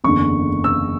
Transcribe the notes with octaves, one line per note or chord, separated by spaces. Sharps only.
F#1 E2 D3 C#6
E6